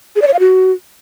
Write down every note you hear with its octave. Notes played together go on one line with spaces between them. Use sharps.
G#4
D5
C#5
F5
F#4